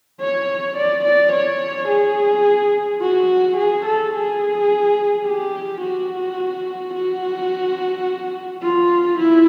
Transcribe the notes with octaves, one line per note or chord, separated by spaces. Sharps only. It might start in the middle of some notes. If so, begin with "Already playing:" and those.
C#5
D5
D5
C#5
G#4
F#4
G#4
A4
G#4
G4
F#4
F#4
F4
E4